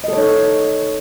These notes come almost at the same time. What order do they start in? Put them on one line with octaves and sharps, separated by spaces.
D#5 A4 C#5 D#4